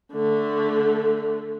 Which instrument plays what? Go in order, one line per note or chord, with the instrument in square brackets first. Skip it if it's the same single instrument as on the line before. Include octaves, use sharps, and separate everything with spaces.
[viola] D3 A3